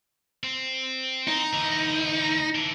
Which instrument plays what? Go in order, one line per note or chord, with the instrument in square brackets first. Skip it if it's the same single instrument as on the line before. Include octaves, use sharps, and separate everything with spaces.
[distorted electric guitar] C4
[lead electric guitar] D#4
[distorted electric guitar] D2 E3
E3 D4